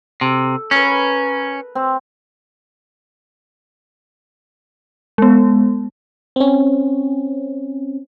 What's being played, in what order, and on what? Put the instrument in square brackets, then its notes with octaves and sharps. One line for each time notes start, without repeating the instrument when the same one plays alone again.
[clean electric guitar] C3 [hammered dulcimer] A4
[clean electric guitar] C#4 [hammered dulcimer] A#4 B4
[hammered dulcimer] C4
[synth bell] G#3 B3
[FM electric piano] C4 C#4